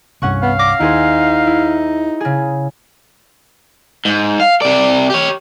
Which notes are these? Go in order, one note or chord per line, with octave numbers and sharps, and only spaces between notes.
C2 G2 C#4 F#5 C#6
B3 F5
D6 A#6
D#2 D#4 E4 G#4 C5
E4
C#3 G#4
G#2
F5
C3 D5
G4 C#5